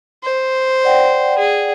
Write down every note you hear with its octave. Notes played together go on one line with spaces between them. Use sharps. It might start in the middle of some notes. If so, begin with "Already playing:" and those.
C5
D5 F#5 G5
G#4